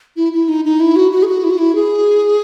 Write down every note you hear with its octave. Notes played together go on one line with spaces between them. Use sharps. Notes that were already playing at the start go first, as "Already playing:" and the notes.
E4
E4
D#4
D#4
E4
F#4
F#4
G#4
F#4
E4
F#4
E4
G#4